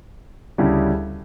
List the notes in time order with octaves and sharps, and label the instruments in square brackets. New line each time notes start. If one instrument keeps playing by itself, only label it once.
[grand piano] D2 C#3 G3 C#4 E4